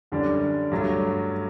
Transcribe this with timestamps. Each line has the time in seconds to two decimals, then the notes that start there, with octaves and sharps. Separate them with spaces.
0.12 F#2 D3 G3 D4
0.72 G2 F#3 A3